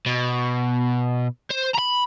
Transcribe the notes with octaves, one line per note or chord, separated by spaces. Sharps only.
B2
C5
A#5 B5